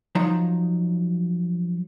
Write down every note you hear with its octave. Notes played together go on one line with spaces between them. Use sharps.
F3 F#3 D#4 A#5